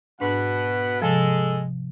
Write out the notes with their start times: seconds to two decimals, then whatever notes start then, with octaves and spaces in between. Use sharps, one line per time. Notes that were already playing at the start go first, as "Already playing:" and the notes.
0.20 G#2 B2 D4 B4 F#5
1.02 C3 F3 G#3 A4